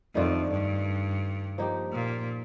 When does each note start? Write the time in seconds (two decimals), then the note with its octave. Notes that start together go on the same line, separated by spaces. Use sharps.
0.15 F2 D#3 A3 D4 F4
0.50 G2
1.58 F3 A#3 D#4 G4
1.92 A#2